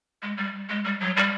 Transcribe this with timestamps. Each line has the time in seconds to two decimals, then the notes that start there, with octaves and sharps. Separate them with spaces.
0.22 G#3
0.37 G3
0.69 G#3
0.84 G3
1.00 F#3
1.17 G3